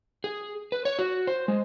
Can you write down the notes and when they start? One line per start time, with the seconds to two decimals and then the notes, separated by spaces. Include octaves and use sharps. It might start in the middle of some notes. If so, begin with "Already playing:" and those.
0.24 G#4
0.72 B4
0.85 C#5
0.99 F#4
1.27 C5
1.48 G#3